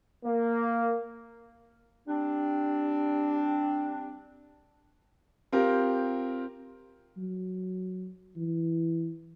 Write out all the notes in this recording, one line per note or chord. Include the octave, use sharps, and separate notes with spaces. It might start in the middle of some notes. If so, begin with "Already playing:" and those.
A#3
G3 C4 D4
C4 F4 G4 A#4
F#3
E3